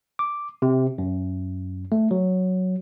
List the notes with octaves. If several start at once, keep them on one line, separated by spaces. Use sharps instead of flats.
D6
C3
F#2
A3
F#3